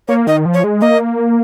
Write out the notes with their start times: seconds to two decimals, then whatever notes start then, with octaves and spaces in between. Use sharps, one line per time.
0.08 A#3 C#5
0.27 D#3 D#5
0.46 F3
0.54 C#5
0.64 G#3
0.81 A#3 D#5